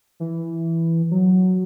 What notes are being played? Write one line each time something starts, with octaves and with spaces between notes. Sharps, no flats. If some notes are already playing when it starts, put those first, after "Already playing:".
E3
F#3